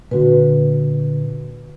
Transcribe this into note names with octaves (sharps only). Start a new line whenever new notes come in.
A#2 D3 F#4 B4